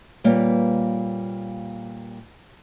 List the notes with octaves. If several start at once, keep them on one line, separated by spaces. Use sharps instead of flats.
A#2 G3 A#3 B4 C#5 F5